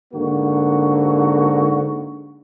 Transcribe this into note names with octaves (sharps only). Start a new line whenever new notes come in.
G#2 D3 A#3 F#4